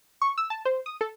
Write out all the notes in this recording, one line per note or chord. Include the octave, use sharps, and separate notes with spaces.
C#6
E6
A5
C5
D#6
A4